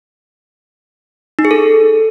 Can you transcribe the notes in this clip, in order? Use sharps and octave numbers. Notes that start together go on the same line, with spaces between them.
D#4
G#4
A4